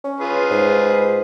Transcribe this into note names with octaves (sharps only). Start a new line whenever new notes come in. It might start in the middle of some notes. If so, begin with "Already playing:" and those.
C#4
F4 G#4 B4
G#2